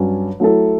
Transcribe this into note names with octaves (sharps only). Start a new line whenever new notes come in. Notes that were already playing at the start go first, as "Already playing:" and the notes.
Already playing: G2 F#3 C#4
F#3 A3 E4 A4